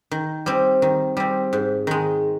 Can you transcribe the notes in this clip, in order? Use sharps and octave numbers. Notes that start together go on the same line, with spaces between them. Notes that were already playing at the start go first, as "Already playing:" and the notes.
D#3
G3 C4
D#3
G3 C4
G#2
D#3 G#3